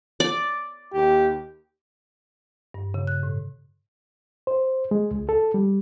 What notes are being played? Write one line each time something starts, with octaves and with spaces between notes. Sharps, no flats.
D5
D#2 G4
G2
C#3
F#6
A2
C5
G#3
C#2
A4
G3